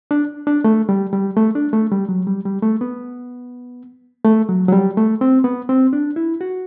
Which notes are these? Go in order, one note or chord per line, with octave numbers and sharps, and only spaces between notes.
D4
D4
A3
G3
G3
A3
D4
A3
G3
F#3
G3
G3
A3
B3
A3
F#3
F#3
G3
A3
C4
B3
C4
D4
E4
F#4